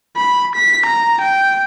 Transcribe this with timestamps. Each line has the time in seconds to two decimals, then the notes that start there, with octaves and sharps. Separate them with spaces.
0.17 B5
0.56 B6
0.86 A#5
1.21 G5